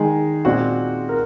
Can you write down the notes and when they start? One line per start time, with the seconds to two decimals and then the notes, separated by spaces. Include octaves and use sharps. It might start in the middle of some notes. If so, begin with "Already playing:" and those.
Already playing: D#3 G#3 D#4 G#4
0.45 A#2 G#3 C4 F#4
1.09 A#4